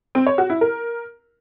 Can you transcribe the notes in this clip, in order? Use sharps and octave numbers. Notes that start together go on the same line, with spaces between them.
C4
C#5
F#4
E4
A#4